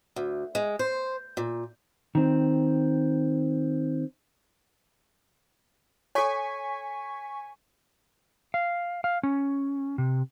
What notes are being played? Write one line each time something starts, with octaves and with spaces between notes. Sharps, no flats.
D2
G#3
C5
A#2
D#3 C4
A4 C#5 G#5 C#6 B6
F5
F5
C#4
C3